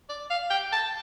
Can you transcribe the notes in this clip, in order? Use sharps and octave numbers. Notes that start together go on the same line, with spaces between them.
D5
F5
G5
A5